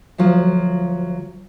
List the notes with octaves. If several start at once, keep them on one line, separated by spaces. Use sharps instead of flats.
D2 F3 F#3 F4